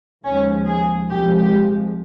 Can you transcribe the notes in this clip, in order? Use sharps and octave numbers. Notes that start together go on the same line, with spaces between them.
D#2 C#3 F3 G#3 C#4
G#4
C2 C3 F3 G#3 G4
G4